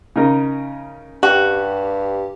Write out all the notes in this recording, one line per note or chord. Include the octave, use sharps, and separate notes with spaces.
C#3 D#4 A#4
G2 F#4 G4